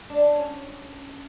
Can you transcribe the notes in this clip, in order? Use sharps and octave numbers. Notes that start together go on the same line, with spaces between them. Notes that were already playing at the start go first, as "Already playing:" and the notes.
D4
C#4